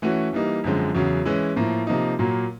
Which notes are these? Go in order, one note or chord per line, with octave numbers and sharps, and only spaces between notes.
E3 A3 C#4 F#4
E3 G3 A#3 D#4
F#2 D3 F3 G#3 C4
E2 C#3 F#3
E3 G#3 C#4 E4
A2 F3 A#3
C3 F3 A#3 D#4
A#2 F#3 A#3